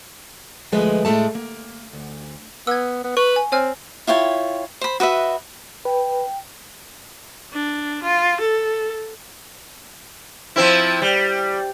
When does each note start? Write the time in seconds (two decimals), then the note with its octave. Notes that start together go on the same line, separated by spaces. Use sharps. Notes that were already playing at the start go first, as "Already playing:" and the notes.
0.72 D2 F3 G#3 A3 B4 D#5
1.05 A2 G#3 A3 A5
1.35 A#3
1.93 D2
2.67 B3 E6 G#6
3.04 B3
3.17 B4 C#6
3.36 G#5
3.52 C4 C#5 G#5 F6
4.07 E4 F4 C#5 G5
4.81 C5 B5
5.00 F#4 B4 D#5 E5
5.85 B4 G5
7.53 D4
8.02 F4
8.40 A4
10.56 F3 C4 E4
11.02 G3